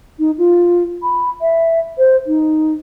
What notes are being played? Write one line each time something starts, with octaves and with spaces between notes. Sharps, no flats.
D#4
F4
B5
E5
C5
D#4